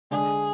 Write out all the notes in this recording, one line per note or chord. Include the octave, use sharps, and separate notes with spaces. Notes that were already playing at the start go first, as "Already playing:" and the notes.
D3 G#3 D4 G#4